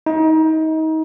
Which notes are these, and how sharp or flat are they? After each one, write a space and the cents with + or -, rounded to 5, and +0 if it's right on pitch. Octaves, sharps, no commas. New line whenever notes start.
D#4 +30